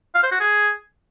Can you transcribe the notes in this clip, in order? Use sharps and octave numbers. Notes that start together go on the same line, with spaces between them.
F5
C5
F#4
G#4